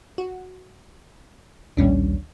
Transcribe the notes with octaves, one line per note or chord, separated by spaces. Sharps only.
F#4
A#1 D#2 A2 G3 C#4 D4